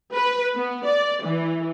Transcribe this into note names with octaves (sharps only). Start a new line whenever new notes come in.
B4
B3
D5
E3